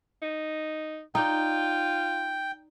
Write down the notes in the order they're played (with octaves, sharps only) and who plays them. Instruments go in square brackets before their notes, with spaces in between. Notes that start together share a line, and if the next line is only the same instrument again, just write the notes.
[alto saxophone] D#4
[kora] D#4 D5 [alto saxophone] F4 [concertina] G5